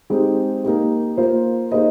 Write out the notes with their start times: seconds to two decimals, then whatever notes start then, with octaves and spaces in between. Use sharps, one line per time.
0.10 G#3 C4 D#4 G4
0.64 A#3 D#4 G4
1.17 A#3 F4 C5
1.72 A#3 D#4 G#4 C5 D#5